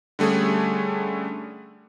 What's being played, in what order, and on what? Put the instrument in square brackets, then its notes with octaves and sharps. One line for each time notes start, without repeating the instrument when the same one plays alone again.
[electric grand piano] D3 G3 A3 C#4 G#4